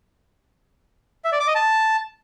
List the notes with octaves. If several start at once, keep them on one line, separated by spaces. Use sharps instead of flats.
E5
D5
D6
D#5
A5